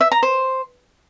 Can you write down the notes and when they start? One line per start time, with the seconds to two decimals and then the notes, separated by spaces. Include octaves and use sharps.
0.01 E5
0.12 A#5
0.23 C5